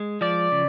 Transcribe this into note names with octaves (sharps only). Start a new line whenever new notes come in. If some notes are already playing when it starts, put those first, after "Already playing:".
Already playing: G#3
F3 D5
C#3